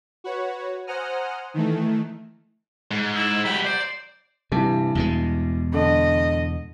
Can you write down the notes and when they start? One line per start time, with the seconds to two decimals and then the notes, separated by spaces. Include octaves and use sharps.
0.24 F#4 B4 C#5
0.87 C5 F#5 G#5 A#5 D#6 F6
1.54 D#3 E3 A3
2.91 G#2
3.14 E4
3.45 F#3 G4 B5
3.65 C5 D5
4.52 G2 C3 E3
4.95 E2 B2 G#3
5.74 D3 D#5